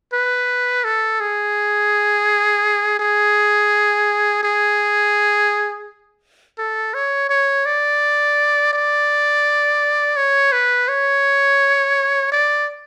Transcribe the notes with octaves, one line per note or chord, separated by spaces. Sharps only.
B4
A4
G#4
G#4
G#4
A4
C#5
C#5
D5
D5
C#5
B4
C#5
D5